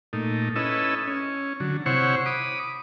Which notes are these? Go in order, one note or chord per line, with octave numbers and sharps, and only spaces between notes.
A#2 A3 D#4
C#4 E4 A4 B4 D#5 E6
C#4
D3 F#3
C3 E4 C5 C#5 F#5 C#6
B5 D6 D#6